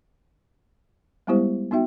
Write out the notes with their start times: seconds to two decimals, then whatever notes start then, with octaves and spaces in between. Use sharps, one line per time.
1.27 G3 G#3 B3 E4 G4 C5
1.71 B3 D#4 F#4 E5 G5